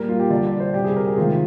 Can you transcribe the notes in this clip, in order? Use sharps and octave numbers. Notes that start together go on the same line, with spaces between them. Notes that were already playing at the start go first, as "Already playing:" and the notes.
Already playing: A#2 G3 A#4
F4
G4
D3 G3 D5
D5
C5
C3 G3 G4
G#4
A#4
G#4
C3 D#3 G#3 F4